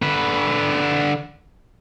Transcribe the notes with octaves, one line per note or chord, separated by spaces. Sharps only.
D3 B4